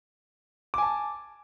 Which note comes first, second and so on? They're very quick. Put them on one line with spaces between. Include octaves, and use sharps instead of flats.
D6 G#5 A5